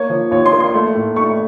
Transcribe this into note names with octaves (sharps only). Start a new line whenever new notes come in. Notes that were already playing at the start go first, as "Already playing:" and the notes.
Already playing: A#3 C#5
F3
D#2 C#5
C6
A#3
C6
A3
A2
A3 C#6